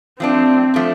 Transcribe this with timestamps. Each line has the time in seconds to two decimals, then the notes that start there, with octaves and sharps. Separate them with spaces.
0.19 F3 A3 C4 D4
0.74 F3 A3 D4